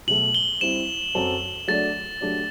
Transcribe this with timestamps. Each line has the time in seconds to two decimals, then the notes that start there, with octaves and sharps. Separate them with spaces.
0.07 B2 F#3 A3 F#7
0.35 G7
0.61 G3 C4 E4 E7
1.15 F#2 F#3 C4 F#4 A4
1.68 F#3 A3 D4 A4 D5 A6
2.21 F#3 A3 D4 G4 D5